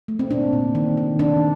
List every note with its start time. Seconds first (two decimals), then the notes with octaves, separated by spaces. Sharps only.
0.08 A3
0.19 C4
0.30 A#2 D4
0.53 A#2
0.75 D#3
0.97 D#3
1.19 D#3 D4